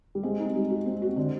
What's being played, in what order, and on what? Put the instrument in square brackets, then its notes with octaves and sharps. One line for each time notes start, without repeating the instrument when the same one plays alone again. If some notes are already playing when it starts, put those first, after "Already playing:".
[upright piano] G3
[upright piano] G#3 [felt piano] C4
[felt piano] D#4
G3
F#4
C4
F#4
[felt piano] D3 [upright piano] C4